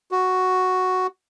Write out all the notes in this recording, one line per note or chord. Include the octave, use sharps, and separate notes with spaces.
F#4